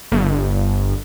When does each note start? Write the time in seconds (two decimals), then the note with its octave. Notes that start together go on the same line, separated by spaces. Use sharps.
0.12 G1